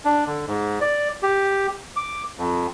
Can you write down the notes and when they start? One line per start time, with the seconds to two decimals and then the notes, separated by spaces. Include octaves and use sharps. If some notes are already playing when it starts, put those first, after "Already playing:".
0.05 D4
0.27 D3
0.48 G#2
0.81 D5
1.22 G4
1.96 D6
2.38 F2